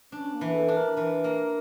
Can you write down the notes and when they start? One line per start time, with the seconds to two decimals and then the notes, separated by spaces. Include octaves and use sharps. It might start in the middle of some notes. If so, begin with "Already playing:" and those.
0.12 C#4 D4
0.34 A#3
0.41 E3
0.55 A4
0.68 D4
0.76 A#4
0.96 E3 A#4
1.24 A#3 A#4